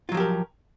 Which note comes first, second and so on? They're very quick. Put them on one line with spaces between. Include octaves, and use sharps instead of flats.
F4 F#3 F3 G4 A#4